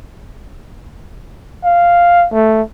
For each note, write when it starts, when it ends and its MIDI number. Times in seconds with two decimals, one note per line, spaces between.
1.64 2.26 77
2.32 2.62 57